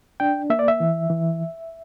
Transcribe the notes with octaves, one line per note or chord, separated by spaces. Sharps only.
D4 G5
A#3 E5
D5
E5
E3
E3